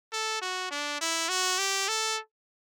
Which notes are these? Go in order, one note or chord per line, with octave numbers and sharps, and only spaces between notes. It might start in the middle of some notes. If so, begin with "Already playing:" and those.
A4
F#4
D4
E4
F#4
G4
A4